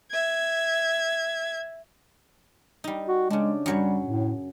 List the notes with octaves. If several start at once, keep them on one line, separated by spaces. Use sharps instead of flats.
E5 G#6
G3 D#4
F#4
C#3 G#3 D4
F#2 F#3 G3 C#5
A2